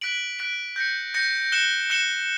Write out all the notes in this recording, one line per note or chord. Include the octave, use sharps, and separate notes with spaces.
F#6 B6 D7 F#7
F#6 B6 D7 F#7
G6 A#6 C#7
G6 A#6 C#7
F#6 C#7 E7 G7
F#6 C#7 E7 G7